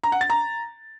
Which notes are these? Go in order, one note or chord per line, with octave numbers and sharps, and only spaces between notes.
A#5
F#5
A6
A#5